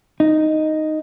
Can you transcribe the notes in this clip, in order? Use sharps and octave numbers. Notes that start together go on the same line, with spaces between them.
D#4